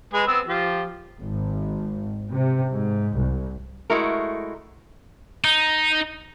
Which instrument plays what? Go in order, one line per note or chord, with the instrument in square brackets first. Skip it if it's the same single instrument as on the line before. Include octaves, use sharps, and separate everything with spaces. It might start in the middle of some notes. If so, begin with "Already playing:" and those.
[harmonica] G#3 G#4 B4
B3 C4 E6
F3 G4
[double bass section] G#1
C3
G#2
C2
[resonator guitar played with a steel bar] G#3 A3 E4 F#4 A#4
[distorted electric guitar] D#4